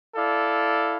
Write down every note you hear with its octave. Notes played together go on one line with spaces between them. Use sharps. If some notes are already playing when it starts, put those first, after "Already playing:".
E4 A4 D5 F5